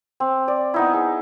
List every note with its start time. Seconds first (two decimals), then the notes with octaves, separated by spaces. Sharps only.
0.20 C4
0.48 D5
0.74 B3 D#4 E4
0.94 G#4